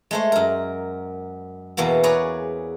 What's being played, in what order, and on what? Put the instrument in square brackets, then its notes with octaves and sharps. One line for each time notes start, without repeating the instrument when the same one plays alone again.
[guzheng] G#3 A3 C5
F#2 A#4
E2 B2 A#3 B3
G#4 B4 C#5 D5 A#5